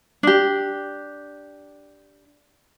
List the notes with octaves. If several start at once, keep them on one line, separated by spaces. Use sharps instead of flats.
D4 G4